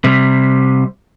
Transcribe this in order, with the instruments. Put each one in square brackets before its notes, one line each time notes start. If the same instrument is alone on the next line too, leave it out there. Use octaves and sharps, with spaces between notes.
[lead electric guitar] C3 G3